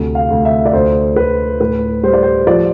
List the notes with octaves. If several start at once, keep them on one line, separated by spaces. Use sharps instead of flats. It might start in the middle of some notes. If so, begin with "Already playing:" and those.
Already playing: D2 C3
F5
D2
E5
D5
D2 C5
D2 B4
A2 B4
G3 C5
D5
C5
F3 D5